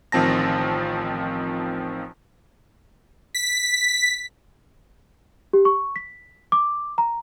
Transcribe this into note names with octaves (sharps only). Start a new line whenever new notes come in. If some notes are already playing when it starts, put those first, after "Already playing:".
A1 D#3 F3 C4 A5 A#6
B6
G4
C#6
B6
D6
A#5